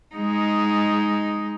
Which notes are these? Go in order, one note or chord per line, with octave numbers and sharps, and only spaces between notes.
G#3 D#4